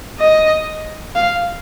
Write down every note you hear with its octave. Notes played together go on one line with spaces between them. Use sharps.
D#5
F5